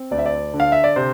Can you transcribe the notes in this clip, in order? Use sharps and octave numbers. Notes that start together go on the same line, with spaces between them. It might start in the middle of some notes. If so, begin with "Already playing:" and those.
Already playing: C4
D2 D5
E5
D5
D3
F5
E5
D5
C3 C5